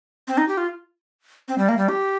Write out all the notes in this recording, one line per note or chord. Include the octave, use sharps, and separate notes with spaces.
C4
D#4
G4
F4
C4
G3
A#3
G3
G4